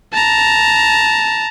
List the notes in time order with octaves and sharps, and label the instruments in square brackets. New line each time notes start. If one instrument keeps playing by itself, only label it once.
[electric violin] A5 A#5